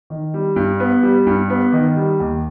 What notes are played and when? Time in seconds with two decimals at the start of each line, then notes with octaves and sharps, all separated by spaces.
0.10 D#3
0.34 G3
0.56 G2
0.80 B3
1.03 G3
1.27 G2
1.50 B3
1.72 D#3
1.96 G3
2.20 D#2